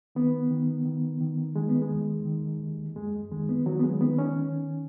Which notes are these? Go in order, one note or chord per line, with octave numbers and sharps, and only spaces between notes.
D#3 B3
D#3
D#3
D#3
D#3 G#3
B3
G#3
D#2
D#3
D#2
F#2 G#3
D#3 G#3
B3
D#3 F#3
B3
G#3
D#3 B3
C#4
D#3